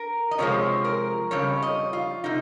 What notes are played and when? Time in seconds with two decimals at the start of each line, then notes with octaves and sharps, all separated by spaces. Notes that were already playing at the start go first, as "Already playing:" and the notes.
Already playing: A#4
0.31 D#5
0.38 C3 F3 G#3 C#5
0.84 A#4
1.31 F2 C#3 G3 C#5
1.63 D#5
1.93 F4
2.24 C3 D#4